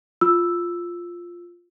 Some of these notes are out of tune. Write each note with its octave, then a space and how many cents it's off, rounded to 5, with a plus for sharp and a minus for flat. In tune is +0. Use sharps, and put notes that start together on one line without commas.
F4 +0 E6 +0